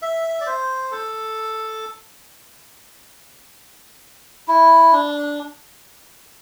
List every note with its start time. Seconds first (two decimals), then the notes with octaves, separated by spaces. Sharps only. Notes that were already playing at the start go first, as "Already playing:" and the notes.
0.02 E5
0.41 D5
0.46 C5
0.91 A4
4.48 E4
4.93 D4